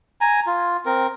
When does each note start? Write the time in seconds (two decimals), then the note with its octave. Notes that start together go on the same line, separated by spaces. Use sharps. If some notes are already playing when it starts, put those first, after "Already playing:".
0.21 G#5 A#5
0.47 F4
0.86 C4 A#4